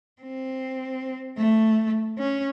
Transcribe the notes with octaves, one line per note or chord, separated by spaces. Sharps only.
C4
A3
C#4